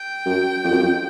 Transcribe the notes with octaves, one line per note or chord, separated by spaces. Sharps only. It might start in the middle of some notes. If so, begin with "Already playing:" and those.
Already playing: G5
F#2
F2
F#2
F2